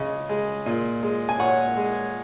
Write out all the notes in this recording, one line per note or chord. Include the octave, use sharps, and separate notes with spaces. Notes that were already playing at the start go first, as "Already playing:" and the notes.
Already playing: C#3 G#3 D#5
G#3
A#2
G#3
G#5
A#2 C#5 F#5
G#3